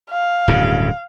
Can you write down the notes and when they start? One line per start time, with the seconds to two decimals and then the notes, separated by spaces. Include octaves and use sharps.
0.10 F5
0.48 D1 G2 C#3